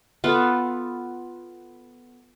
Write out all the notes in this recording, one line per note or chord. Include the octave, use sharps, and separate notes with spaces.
B3 F4 A4